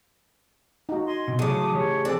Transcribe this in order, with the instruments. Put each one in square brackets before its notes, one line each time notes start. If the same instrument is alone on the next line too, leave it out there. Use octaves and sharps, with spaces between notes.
[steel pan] D#4 F#4
[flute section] D#5 G#5 C6
[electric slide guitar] B2
[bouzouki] A2 C#3 [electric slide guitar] E3 F#3 G#4 [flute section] D6 D#6
[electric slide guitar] E3 G4 [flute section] G#4 C#5
[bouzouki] C4 [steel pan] G#4 A4 D5 [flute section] F#6